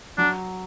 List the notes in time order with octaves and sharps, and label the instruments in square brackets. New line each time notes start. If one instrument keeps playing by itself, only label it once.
[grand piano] F#3 [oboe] D4